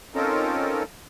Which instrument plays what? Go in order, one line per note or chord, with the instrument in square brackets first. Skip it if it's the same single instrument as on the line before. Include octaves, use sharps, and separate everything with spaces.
[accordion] C4 C#4 D#4 F4 A4 A#4